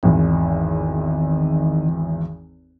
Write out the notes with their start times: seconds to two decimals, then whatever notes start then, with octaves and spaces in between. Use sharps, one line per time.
0.03 G#1 E2 D#3